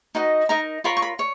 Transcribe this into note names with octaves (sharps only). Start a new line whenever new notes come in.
D#4 F#4 B4 D#5
D#4 A#4 D#5 A#5
F4 A#4 C#5 B5
C#6
B5
C#5